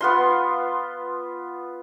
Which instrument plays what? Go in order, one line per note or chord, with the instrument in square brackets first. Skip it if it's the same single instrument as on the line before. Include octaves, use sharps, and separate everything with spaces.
[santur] B3 F4 C6